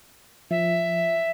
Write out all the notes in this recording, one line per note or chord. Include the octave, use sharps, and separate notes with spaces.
F3 E5